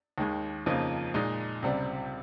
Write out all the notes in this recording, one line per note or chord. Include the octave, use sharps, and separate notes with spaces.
D#2 D#3 G#3
F2 C#3 F3 A#3 D#4
A#2 G#3 D#4
C#2 C3 G3 C4